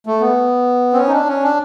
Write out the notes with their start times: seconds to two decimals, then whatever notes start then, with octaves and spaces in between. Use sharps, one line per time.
0.06 A3
0.21 B3
0.93 C4
0.97 C#4
1.08 D#4
1.12 D4
1.28 C#4
1.43 D4